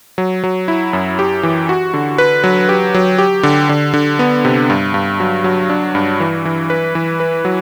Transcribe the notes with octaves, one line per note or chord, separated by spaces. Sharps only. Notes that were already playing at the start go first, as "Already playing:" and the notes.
F#3
F#3
E4
F#2
G4
E3
F#4
D3
B4
F#3
G4
F#3
G4
D3
D3
D3
B3
C3
G2
G2
F#3
F#3
D4
G2
E3
E3
B4
E3
B4
F#3